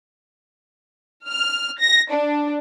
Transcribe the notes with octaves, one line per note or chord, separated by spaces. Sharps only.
F6
A#6
D4